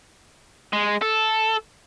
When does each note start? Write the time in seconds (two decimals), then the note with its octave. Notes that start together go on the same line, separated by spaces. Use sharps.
0.73 G#3
1.02 A4